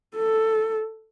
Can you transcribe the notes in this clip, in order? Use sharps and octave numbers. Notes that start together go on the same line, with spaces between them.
A4